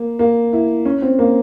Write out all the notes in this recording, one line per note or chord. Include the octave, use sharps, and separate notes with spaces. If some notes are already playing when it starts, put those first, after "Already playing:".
Already playing: A#3
A#3
E4
C#4
C4
A#3